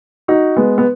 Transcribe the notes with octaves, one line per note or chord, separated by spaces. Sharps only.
D#4 F#4
G#3 B3
B3